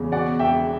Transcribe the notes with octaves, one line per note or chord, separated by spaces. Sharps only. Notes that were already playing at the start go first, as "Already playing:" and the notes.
Already playing: E2 C#3
B2 D5 F#5
E1 E5 G5